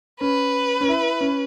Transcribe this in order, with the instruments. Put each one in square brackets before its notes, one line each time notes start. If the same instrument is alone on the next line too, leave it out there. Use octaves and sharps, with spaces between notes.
[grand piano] C#4 [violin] B4
[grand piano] C#4
E4
C#4